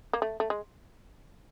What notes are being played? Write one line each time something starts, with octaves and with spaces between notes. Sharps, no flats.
A#3
A3
A3
G#3